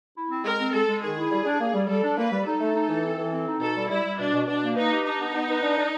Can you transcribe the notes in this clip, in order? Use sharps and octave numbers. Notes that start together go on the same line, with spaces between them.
E4
C4
G#3 A#4
C4
G#3 A4
G#3
D#3 G#4
E4
G3
D4
A#3
G3
G3 A4
D4
A#3 B4
G3
D#4 A4
A3
D#4
E3
C4
E3
C4
D#4
B2 A4
G3
G3 E4
G3
B2 D4
B2
B2 D4
A#3
D#4 B4
G4
D4 D#4
B3
B3
B4
D4
D4